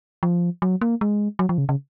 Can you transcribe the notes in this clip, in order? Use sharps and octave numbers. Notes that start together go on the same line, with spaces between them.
F3
F#3
A#3
G#3
F#3
F3
C#3
C#3